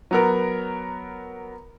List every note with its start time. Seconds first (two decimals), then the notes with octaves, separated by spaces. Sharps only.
0.11 F#3 B3 A#4